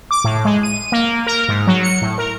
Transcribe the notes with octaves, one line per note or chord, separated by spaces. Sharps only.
D6
A2
G#3
D#7
A#3
A#4
G#2
F#3
C#7
A2
A#4